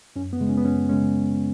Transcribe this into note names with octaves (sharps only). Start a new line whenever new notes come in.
F#2 C#4
B3
C#3 G#3
C#4
B3
F#2 C#4
C#3 G#3 C#4